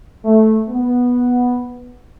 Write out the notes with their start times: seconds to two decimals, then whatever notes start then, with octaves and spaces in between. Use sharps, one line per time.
0.25 A3
0.69 B3